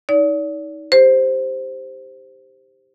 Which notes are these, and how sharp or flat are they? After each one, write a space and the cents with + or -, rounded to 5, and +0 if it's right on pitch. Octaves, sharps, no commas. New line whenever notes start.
D#4 +25 D5 -40
G4 +15 C5 +0